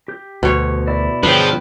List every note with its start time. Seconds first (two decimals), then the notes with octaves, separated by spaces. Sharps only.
0.08 G4 G6
0.43 D2 B2 C#5
0.87 E4 D5
1.23 G2 D3 F3 D4 G#4 B4 C#5 G5